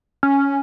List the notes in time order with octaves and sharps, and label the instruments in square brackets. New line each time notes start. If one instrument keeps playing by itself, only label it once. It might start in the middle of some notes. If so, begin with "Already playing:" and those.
[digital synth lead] C#4